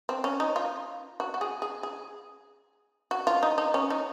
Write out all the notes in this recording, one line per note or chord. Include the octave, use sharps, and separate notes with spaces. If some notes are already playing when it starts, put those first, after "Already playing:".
C4
C#4
D#4
F4
F#4
F#4
G#4
G#4
G#4
F#4
F4
D#4
D#4
C#4
D#4